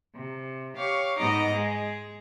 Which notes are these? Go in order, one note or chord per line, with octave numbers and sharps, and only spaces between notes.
C3
G4 C#5 F5 C#6
G#2 B3 D#4 D#5 A#5 D6
G#3 G#4